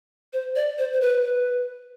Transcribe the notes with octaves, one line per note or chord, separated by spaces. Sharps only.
C5
D5
C5
C5
B4
B4